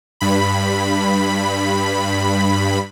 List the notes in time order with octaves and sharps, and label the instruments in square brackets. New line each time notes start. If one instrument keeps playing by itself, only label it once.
[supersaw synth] G2 B5